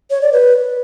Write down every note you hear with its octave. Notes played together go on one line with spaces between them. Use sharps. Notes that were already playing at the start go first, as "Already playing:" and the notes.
C#5
D5
B4